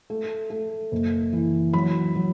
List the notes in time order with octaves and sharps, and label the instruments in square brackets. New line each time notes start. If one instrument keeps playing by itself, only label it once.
[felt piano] A3
A3
F#1
E3
F#3 B5
F#3